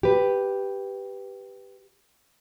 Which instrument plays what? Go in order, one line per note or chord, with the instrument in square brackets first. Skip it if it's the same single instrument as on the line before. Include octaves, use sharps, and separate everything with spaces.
[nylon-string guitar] G4 B4